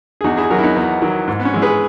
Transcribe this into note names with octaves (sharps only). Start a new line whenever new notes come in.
G#4
E2 D#4 F#4
E4 G#4
D#3 F#3 F#4 A#4
E4
B3 D#4
E2 B3
D#3 F#3
G#2
B3
C#4
E3 G#3
G#4 B4